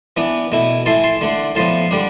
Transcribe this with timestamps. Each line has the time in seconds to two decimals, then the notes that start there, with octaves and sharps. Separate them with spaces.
0.17 E3 B3 D4
0.52 B2 A3 E4
0.86 E3 A3 E4 A5 C6
1.04 A5 C6
1.21 D3 A3 D4
1.55 A2 F3 B3 A5 C6
1.91 D3 G3 D4